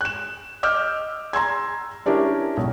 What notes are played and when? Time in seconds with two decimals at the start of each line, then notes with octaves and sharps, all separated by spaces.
0.01 F#6 E7
0.63 D#5 D6 E6 F6 G6
1.33 A#5 C6 E6 G#6
2.06 C#4 D4 E4 G4 A#4
2.57 B1